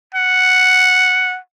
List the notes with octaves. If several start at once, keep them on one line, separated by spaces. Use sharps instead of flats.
F#5